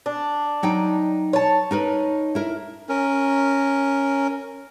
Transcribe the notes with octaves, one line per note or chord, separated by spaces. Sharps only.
D4
F#3 D#4 G5
C#5 A5
D#4 A#4 B4
E4 A#4
C#4 A#4